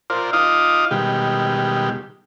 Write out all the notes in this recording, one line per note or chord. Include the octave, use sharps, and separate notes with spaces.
F4 A#4 C5 D5
D#4 F4 F5 D6 D#6
B2 D#3 G3 G#3 G4